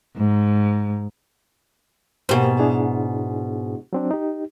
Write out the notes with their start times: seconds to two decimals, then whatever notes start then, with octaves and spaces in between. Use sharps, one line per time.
0.17 G#2
2.29 G#2 B2 A#3 G4 C5
2.59 D4 E4 G#4
3.93 F#3 C4 D4
4.11 D#4 G4